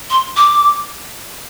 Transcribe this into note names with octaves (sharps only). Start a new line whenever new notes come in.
C6
D6